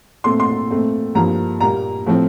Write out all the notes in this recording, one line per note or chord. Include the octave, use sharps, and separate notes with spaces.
A#2 A3 C4 C6
C6
A#2 A3 C4
G2 F3 A#3 A#5
A#2 G3 A#3 A#5
A2 F3 A3 C4